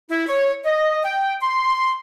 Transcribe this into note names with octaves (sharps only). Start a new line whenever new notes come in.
E4
C#5
D#5
G5
C6